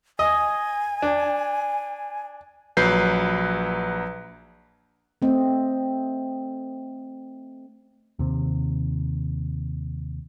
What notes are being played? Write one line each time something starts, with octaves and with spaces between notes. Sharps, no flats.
D#5 G#5
D4
A#1 F#3 B4 G6 C7
A3 C4 D#5
D#2 C3